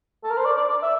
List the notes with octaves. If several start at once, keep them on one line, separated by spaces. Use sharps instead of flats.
A4
A#4
C5
D5
D5
D5
E5